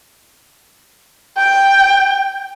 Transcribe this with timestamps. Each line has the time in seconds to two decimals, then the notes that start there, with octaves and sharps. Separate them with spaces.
1.37 G5